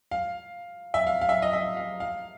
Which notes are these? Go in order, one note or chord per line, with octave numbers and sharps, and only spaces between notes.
F5
E5
F5
F5
E5
D#5
E5
F5
F5